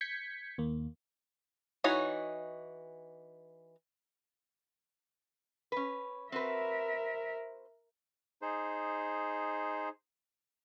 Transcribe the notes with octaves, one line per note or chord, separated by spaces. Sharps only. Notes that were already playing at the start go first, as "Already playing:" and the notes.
G6 G#6 B6 C#7
D#2 A#3
E3 D#4 F#4 C#5
C#4 B4
C4 F#4 A#4 B4 E5
D#4 G#4 C5